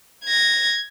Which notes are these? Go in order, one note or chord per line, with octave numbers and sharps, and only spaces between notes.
G#6 A#6